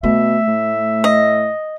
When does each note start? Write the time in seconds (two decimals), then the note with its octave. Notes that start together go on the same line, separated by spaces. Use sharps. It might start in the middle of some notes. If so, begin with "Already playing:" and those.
0.03 B2 A3 E5
0.48 A2
1.04 D#5